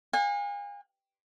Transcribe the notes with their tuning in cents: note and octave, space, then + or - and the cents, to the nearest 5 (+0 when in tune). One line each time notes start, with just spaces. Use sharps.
F5 +45 G#5 -35